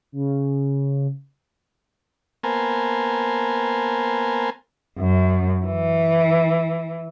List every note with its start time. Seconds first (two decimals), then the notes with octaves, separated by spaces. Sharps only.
0.12 C#3
2.43 A#3 B3 A#4 C5 G#5 A5
4.99 F#2
5.66 E3